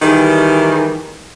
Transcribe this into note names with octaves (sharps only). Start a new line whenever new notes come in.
D#3 E3 G3 G#4